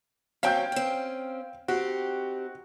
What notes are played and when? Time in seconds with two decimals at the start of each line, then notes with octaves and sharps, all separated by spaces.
0.43 F#3 C4 C#4 F5 G5 G6
0.72 C4 C#4
1.68 C4 D#4 F#4 G4